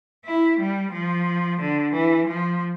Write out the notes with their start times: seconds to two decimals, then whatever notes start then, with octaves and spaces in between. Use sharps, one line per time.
0.25 E4
0.59 G3
0.92 F3
1.60 D3
1.93 E3
2.26 F3